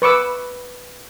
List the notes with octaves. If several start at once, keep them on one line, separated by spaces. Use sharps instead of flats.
B4 C#6 D6 E6